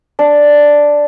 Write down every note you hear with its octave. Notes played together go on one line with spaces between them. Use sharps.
D4